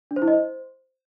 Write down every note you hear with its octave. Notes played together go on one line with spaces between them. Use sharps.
D4
C5
E4
D#5
C5